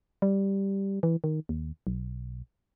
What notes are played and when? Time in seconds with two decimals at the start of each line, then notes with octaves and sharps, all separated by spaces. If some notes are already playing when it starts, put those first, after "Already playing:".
0.22 G3
1.03 E3
1.24 D#3
1.49 D#2
1.87 B1